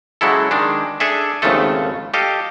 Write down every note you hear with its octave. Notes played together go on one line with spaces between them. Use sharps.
C#3 F#3 G#3 E4 A4
D#3 G#3 D4
D4 G#4 A4 E5
G#1 D#2 C#3 F3 A3 A4
G4 A4 D#5 F5